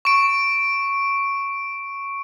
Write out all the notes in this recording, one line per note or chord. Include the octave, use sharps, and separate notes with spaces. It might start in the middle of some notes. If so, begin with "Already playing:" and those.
C#6 D7